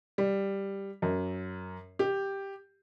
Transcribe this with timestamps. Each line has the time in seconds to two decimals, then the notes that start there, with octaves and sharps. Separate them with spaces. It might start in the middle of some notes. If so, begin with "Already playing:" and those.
0.18 G3
1.02 F#2
1.99 G4